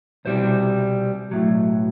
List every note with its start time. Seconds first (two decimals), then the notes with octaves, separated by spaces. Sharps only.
0.25 C2 B2 G3 C4 C5
1.31 B1 A2 F#3